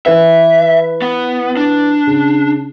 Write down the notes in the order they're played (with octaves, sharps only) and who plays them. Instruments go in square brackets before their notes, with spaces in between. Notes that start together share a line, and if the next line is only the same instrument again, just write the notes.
[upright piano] E3 B4 [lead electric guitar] E5
[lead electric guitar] B3
D4
[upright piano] C#3